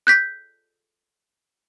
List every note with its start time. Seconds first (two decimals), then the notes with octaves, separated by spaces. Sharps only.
0.07 F#6 G6 B6